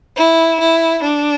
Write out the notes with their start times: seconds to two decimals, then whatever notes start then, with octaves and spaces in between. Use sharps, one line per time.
0.16 E4
0.59 E4
1.01 D4